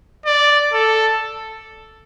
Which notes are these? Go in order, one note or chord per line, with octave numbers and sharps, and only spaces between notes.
D5
A4